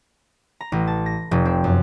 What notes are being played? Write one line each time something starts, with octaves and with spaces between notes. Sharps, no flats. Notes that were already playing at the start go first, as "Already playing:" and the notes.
A#5
A1
A5
A#6
F1
C4
F#2